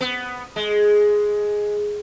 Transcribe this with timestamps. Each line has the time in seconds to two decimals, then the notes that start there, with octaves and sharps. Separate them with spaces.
0.01 B3
0.56 G#3